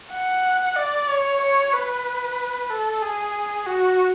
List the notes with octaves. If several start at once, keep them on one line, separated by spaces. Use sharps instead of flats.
F#5
D5
C#5
C#5
B4
A4
G#4
F#4